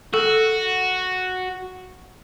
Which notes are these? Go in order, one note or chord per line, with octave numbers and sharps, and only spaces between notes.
F#4 A4